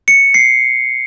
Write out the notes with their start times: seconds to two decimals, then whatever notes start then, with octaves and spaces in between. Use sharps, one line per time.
0.08 C#7
0.34 C7